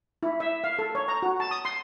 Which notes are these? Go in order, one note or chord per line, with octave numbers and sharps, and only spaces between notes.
E4
E5
F5
A4
C#5
A#5
F#4
A5
D#6
C6